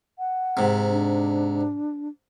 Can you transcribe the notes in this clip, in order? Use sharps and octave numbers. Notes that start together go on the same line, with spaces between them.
F#5
G#2 C3
D4